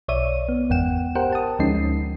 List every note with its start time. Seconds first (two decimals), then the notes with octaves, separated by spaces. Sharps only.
0.08 B1 C#5 D5 E5 D#7
0.49 B3
0.70 G1 E2 G#2 F#5 G5 E7
1.15 G4 A#4 C5 F#5 G5
1.32 A5 D#6
1.59 D2 F3 G#3 C#4 D#4 C7